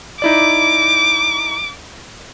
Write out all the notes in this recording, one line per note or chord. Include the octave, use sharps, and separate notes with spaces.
D#4 E4 D5 D6